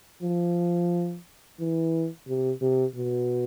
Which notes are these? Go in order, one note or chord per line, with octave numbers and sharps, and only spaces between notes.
F3
E3
C3
C3
B2